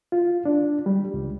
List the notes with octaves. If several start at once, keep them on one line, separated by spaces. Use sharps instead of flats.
F4
D4
G3
C#2